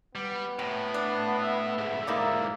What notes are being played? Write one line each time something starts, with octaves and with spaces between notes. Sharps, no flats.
G3 B3
A2 C3
D4
E5
B1 G#2
A#3 D#4 E4 D5 E5